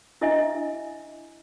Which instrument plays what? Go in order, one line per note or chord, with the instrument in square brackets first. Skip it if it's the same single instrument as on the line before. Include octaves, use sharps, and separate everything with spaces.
[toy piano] D4 E4 D#5 E5 G#5